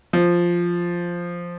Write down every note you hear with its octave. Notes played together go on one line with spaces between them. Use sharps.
F3